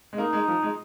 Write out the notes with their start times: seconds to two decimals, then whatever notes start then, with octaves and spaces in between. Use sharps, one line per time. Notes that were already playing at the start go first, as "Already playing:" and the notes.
0.13 G#3
0.18 A#3 D#4
0.33 G#3
0.48 F3
0.63 G#3